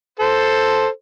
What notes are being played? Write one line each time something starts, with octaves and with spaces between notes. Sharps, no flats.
A4 C5